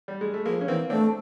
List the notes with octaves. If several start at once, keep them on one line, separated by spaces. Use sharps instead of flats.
G3
G#3
A3
F3 G#3 A#3
C#4
E3 A#3 C4
A3 C4 D4